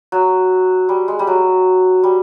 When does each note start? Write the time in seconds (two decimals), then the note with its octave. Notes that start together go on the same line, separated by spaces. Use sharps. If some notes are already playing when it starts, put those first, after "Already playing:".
0.12 F#3
0.89 G3
1.08 G#3
1.19 G3
1.27 F#3
2.03 G3